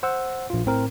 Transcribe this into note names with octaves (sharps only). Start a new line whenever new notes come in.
C5 F#5 E6
A#1 F4
A2 C4 A#4